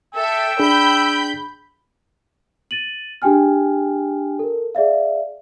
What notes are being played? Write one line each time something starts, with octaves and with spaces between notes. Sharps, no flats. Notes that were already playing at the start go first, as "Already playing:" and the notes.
A4 E5 G5 E6
D4 G#4 B5 G6
A6 D#7 F#7
D4 G4 G#4 G5 G#5 F6
A4 A#4
G#4 D5 E5 F5